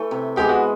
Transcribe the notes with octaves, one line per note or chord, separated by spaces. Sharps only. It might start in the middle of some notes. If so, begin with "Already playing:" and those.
Already playing: E3 A3
C3
E3 G#3 B3 G4
F#4